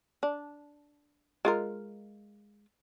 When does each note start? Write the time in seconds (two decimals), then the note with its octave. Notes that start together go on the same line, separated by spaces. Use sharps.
0.23 D4
1.45 G#3 F4 A#4